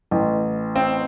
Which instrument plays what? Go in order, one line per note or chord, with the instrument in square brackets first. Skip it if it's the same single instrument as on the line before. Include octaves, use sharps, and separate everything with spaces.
[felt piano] A1
[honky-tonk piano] C4